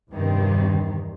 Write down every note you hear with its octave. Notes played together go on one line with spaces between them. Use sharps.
E2 G2 C3 D#3